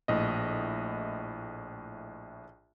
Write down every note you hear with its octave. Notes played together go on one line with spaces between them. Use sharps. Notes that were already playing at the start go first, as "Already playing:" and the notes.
A#1 A2 D#5